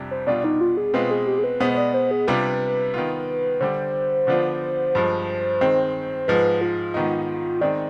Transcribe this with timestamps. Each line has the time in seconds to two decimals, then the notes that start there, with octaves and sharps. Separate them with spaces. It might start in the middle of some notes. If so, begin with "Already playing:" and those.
Already playing: F2 C3 G3 D4
0.11 C5
0.27 B2 G3 D4 F4 D5
0.44 D#4
0.61 F4
0.77 G#4
0.94 B2 G#3 C4 F4 B4
1.11 G#4
1.27 G4
1.39 G#4
1.44 B4
1.60 B2 G#3 B3 C5
1.74 C5
1.78 D5
1.94 C5
2.11 G#4
2.28 C3 G3 D4 F4 B4
2.94 D#3 B3 F4
3.61 D3 G3 D4 C5
4.27 D3 F3 B3 D4 F4
4.95 G2 F3 G#3
5.61 D#3 G#3 C4
6.27 G#2 F3 G#3 B4
6.61 F4
6.94 G#2 D#3 B3 D#4
7.61 D#3 G#3 C4 D#4 D5